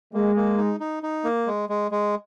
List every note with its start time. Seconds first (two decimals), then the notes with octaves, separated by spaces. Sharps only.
0.13 G#3 A#3
0.36 A#3
0.58 D#4
0.80 D#4
1.03 D#4
1.24 A#3
1.47 G#3
1.69 G#3
1.91 G#3